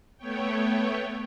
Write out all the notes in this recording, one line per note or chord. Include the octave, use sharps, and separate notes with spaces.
A3 B3 C#5 G5